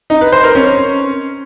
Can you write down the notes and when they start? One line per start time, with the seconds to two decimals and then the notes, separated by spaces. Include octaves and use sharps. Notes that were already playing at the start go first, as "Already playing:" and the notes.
0.10 D#4
0.21 B4
0.32 C5
0.44 A#4
0.55 C#4